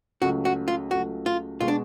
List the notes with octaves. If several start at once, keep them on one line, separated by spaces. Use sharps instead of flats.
C#2 C#3 F#3 A3 F#4
F#4
F4
C#2 C#3 F#3 A3 F#4
F4
B2 G#3 F4
D4